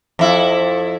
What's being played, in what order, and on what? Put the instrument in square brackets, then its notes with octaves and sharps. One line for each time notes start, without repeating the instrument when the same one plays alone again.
[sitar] F2 E4